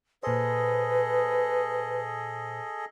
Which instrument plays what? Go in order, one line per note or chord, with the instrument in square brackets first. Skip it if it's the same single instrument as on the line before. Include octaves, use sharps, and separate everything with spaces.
[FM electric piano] A#2 C5 [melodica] G#4 A4 D#5 [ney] B4